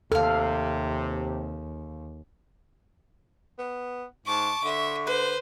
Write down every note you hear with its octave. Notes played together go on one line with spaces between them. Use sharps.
D#2 C3 A4 F5 F6
B3
G#2 A5 C#6 D6
D3 E5
B4 C5